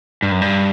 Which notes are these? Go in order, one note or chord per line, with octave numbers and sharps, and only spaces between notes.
G2
F#2
G2